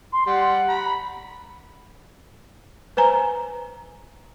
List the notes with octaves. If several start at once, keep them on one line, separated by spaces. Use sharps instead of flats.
C6
G3 F#5
A#5 B5
B4 C5 G#5 A#5